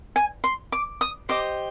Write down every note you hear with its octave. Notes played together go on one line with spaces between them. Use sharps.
G#5
C6
D6
D#6
G4 C5 D#5 D6